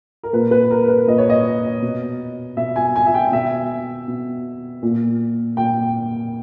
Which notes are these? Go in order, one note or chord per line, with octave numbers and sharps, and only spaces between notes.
A#4
A#2 B4
B4
A#4
B4
A#2 D#5
C#5
D#5
B2
B2 E5
G#5
G#5
E5
G5
B2 E5
B2
A#2
A#2 G5